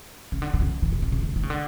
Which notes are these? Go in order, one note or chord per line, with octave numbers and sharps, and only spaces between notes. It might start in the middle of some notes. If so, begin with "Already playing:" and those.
C#3
D3
D3
C#3
D#3
B2
C3
C#3
D3
D#3
C#3
D3